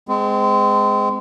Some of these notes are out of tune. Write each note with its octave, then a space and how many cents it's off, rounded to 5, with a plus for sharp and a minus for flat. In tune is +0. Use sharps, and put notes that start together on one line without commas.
G#3 +0 C4 -30